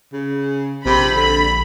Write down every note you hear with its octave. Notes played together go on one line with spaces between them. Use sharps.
C#3
A#1 C3 B5
D3 B5